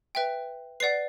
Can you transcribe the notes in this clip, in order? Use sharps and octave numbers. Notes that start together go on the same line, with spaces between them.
B4 E5 G5
B4 D5 F#5 C7